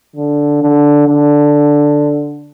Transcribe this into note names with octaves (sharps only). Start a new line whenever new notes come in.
D3
D3
D3